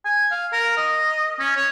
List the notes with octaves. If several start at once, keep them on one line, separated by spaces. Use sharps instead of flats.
G#5
F5
A#4
D#5
C#4
C#5